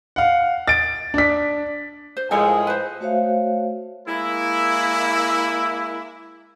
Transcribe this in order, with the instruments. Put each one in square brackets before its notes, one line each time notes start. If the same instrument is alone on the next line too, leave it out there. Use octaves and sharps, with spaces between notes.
[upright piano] F5 F#5
A6 D7
D4 B6
[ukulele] C5
[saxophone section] A2 F3 G#3 [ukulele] A4 A#4 G#5
[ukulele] B4 C5
[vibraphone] A3 F#4 C5 C#5 E5 F5
[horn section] G#3 A#3 E4